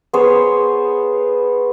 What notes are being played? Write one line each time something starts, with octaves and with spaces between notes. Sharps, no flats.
B3 G#4 C5 C#5